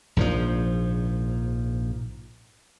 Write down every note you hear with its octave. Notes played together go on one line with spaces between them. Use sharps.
A#1 G#2 D#3 F3